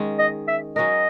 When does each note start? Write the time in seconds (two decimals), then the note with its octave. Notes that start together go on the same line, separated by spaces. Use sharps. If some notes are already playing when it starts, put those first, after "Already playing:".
Already playing: D#3 G#3 C#4
0.19 D#5
0.48 E5
0.76 F#3 C#4 F#4 A#4 D#5